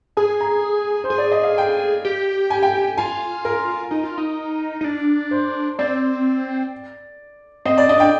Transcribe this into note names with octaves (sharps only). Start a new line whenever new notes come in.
G#4 G#5
A#5
C5
G#4
D5
D#5
F5
G5
G4
G#5
G5
F4 G#5
A#4
D#4
F4
D#4
D#4
D4
C5
C4 D5
C4 D#5
D5
D4 D#5
G5